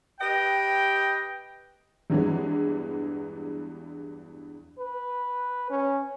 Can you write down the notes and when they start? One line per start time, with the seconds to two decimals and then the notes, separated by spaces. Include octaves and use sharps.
0.20 G4 B4 D#5 G5
2.10 E2 G2 E3 F#3 G#3
4.79 B4
5.70 C#4